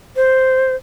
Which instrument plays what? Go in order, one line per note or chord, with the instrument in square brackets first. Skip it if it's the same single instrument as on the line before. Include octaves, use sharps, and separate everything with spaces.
[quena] C5